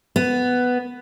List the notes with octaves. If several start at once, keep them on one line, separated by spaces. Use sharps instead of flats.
B3